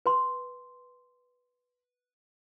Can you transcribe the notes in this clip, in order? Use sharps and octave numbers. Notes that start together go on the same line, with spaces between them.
B4 C6